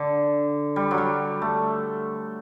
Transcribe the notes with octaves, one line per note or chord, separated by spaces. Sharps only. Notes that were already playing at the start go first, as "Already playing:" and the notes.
Already playing: D3
G3
F#3
G3
A3